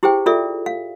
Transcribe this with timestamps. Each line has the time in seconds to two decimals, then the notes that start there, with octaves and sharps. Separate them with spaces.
0.03 E4 G4 G#4 C5 G5
0.26 F4 G#4 A4 D5 E5
0.66 F5